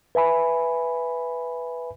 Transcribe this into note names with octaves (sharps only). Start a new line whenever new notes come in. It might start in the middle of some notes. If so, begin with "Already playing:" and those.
B4 E5 G#5 B5